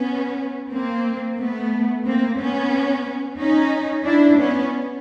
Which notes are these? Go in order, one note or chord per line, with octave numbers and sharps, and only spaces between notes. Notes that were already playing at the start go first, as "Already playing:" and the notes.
Already playing: B3 C#4
A#3 C4
A3 B3
A#3 C4
B3 C#4
C#4 D#4
D4 E4
B3 C#4